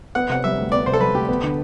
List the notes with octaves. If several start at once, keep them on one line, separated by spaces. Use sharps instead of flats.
B3 F#5
C3 F#5
G3 E5
D2
B3 D5
C3 C5
A4
G3 B4
D2 G4
B3
D3